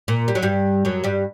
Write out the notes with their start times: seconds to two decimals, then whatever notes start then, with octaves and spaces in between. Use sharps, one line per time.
0.08 A#2
0.28 G3
0.35 F#3
0.43 G2 G3
0.85 F#2 F#3
1.04 G2 G3